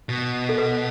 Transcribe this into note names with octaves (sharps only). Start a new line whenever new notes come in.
B2
A4
B4